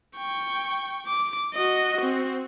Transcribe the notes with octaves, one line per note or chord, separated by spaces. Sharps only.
G5 C#6
D6
F#4 D#5
C4 F#4